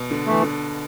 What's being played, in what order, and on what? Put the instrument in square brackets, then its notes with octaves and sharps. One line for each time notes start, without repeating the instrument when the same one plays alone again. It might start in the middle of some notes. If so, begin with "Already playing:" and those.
Already playing: [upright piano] B2
D3
[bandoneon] E3 A3
[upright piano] D3